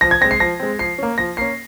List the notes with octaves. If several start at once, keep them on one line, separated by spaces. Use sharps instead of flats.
F3 A#6
G#6
G#3 C4 A#6
C7
F3 A#6
G#3 C4
F3 C7
A#3 C#4
F3 A#6
A#3 C#4 C7